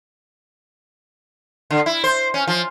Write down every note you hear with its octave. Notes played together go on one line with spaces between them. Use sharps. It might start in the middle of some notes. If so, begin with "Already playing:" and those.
D3
E4
C5
C#4
F3